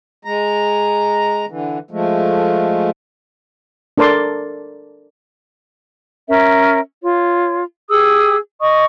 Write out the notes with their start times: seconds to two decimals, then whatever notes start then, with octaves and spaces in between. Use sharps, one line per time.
0.25 G#3 A#5
1.49 D3 E3
1.91 F3 G#3 A3
3.98 D4 A4 A#4 D5 C6
6.28 C#4 A#4 E5
7.03 F4 C#5
7.90 G4 G#4 D#6 E6
8.61 D#5 C#6 D#6